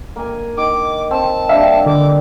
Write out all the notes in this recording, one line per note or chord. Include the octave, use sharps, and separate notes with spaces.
A#3 G#5
D#3 D6
C4 A5
G3 A#3 D4 E5 F5
D3 D6